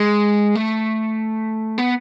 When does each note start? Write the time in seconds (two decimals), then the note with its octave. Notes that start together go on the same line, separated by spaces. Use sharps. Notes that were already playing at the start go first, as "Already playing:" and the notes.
Already playing: G#3
0.55 A3
1.78 B3